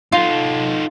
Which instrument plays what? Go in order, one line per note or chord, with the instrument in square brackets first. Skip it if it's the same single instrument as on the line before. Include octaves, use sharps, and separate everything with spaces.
[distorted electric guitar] D#4 A4 [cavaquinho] F4